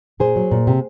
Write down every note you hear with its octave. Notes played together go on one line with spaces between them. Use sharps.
A#2 G#4 C5
F#3
A#2
C3